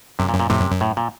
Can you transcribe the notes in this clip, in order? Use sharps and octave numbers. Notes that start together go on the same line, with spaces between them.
F#2 C3
A#2
F#2
A#2
F2 A2 C3
F#2
F#2
A2
A#2